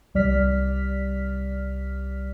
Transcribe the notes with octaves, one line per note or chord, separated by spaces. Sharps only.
C2 G3 D5 F6 B6